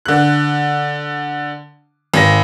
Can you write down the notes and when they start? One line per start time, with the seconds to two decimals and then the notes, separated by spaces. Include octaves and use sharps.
0.05 D3 F#6
2.14 G#1 A#6